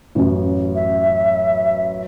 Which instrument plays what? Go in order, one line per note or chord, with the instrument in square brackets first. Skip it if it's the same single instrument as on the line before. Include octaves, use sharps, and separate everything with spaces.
[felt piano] A1 F#2
[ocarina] E5